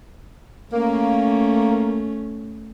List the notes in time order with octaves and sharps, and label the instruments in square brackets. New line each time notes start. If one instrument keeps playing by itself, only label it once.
[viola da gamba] A3 C#4 [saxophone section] A#3